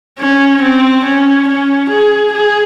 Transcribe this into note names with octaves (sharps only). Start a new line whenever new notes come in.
C#4
C4
C#4
C#4
G#4
G#4